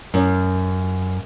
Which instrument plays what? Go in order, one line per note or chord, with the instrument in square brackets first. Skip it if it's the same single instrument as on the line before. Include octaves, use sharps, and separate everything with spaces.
[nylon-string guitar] F#2